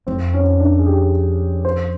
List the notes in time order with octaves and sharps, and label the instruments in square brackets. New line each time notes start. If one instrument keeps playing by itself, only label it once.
[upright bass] F2 [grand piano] C4
[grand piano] C#4
C#4
D4
G#4
G4
C5